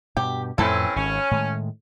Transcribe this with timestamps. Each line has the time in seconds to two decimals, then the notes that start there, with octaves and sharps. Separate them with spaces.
0.17 G2 B2 G4
0.58 F2 A2 E3 A3 C4 C#4 E4 A4
0.96 G#1 C#4
1.31 A2 D#3 G#3